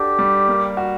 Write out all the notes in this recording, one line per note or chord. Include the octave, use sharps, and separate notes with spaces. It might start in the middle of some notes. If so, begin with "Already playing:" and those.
Already playing: D4 F#4 G4 A4
G3
A#3
F#4